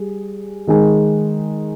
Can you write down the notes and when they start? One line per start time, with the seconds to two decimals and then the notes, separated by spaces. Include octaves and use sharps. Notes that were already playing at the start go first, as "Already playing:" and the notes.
Already playing: G3 G#4
0.67 D#3 G#3 D#4 G#4